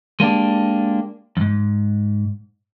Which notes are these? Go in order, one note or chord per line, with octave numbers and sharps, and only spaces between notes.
G#3 A#3 D4 G4
F2 G#2